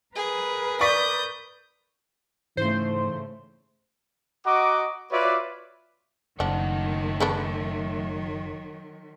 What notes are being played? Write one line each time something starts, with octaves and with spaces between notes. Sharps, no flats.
G#4 A#4 B4
D5 C#6 D#6 G6 B6
G#2 C#3 E3 A3 C5 C6
F#4 D#5 F#5 A#5 D6
F4 F#4 B4 C#5 D5 E5
F#1 D#3 F3 F#3 A3 D4 F#5
C#3 B3 D4